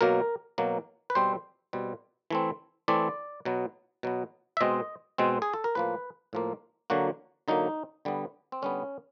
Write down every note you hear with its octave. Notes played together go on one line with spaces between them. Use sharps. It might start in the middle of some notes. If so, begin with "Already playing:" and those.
B2 F#3 A#3 A#4
B2 F#3 A#3
B4
B2 G3 C4 C5
B2 G3 C4
E3 A3 C4
E3 A3 C4 D5
B2 F#3 B3
B2 F#3 B3
E5
B2 G#3 C4 D#5
B2 G#3 C4
G#4
A4
A#4
A2 F3 A#3 B4
A2 F3 A#3
D3 F#3 A#3 F#4
D3 F#3 A#3 D#4
D3 G3 B3
C4
D3 G3 B3 C#4